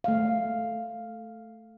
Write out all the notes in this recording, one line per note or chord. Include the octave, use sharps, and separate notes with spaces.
A3 F5